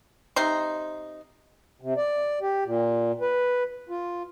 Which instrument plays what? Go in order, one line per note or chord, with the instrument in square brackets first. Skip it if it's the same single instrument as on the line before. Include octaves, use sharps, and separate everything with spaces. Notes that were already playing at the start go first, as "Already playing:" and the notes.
[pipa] C3 D#4 C6
[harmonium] C3
D5
G4
A#2
B4
F4